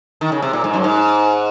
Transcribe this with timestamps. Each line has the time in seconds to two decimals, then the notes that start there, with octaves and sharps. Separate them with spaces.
0.21 D#3
0.32 C#3
0.42 C3
0.53 A#2
0.64 G#2
0.74 F#2
0.84 G#2